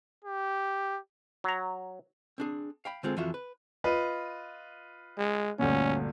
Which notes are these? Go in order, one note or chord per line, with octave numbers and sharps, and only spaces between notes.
G4
F#3 A#5
C4 D4 G#4
F5 G5 B5
D3 G#3 C4 F4 G#4 A4
F2 E3 F4 F#4 E5
B4
F4 B4 D#5
G#3
G1 D2 A#2 C#4